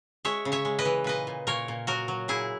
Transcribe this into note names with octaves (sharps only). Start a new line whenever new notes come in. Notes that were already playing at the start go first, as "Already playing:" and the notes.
G#3 C#5 E5
C#3
C#5 E5
G#3
B4 D#5
E3
A#2 B4 D#5
A#2
A#2 A#4 C#5
A#2
F#3 F#4 A#4
F#3
A#2 E4 G#4